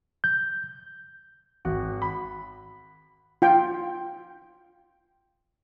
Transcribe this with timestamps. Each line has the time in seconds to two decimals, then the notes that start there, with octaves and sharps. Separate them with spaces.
0.24 G6
1.65 G#1 F#4
2.02 B5
3.42 F4 G5